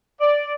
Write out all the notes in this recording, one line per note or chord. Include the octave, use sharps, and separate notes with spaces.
D5